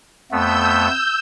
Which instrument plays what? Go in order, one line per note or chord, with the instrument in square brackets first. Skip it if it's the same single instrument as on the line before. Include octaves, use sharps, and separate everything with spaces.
[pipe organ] F2 A3 B3 [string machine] E6 G6